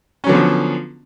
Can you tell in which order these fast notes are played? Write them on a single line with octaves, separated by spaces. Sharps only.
C#4 F#3 D3 B3 F3